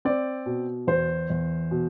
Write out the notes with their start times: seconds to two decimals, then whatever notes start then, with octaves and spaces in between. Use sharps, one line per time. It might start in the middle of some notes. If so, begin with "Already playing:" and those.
0.05 C4 D5
0.46 B2
0.87 E2 C5
1.30 E2
1.71 B2